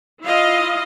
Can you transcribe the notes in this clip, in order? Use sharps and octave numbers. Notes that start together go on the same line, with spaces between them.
E4 F4 D#5 F5